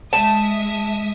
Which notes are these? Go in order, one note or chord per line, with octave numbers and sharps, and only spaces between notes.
G#3 E5 A5 D#6